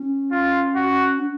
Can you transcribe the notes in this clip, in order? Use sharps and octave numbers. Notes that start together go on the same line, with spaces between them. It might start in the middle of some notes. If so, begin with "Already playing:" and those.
Already playing: C#4
F4
F#4
D4